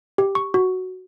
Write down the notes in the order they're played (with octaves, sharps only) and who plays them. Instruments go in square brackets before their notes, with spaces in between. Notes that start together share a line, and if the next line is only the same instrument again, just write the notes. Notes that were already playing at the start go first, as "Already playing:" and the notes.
[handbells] G4
C#6
F#4